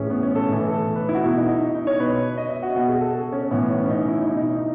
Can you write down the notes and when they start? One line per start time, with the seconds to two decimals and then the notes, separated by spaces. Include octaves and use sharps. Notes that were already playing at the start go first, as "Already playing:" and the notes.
Already playing: A2 E3 C#4 G#4
0.10 B3
0.23 C#4
0.35 A4
0.49 A2 E3
0.67 A4
0.96 B4
1.09 E4
1.14 F#4
1.24 B2 E4
1.37 D#4
1.49 D#4
1.61 D#4
1.75 D#4
1.87 C#5
2.00 B2 B4
2.38 D#5
2.50 E5
2.62 F#4
2.76 B2 F#4
2.88 G#4
3.01 A4
3.13 A4
3.32 C#4
3.51 A2 E3 B3
3.70 C#4
3.83 C#4
3.89 D#4
4.08 E4
4.27 B2 E4
4.37 D#4
4.55 D#4